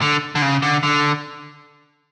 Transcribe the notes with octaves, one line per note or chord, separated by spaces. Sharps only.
D3
D3
C#3
D3
D3